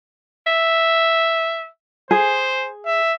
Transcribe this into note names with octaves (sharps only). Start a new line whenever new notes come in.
E5
G#4 C5
E5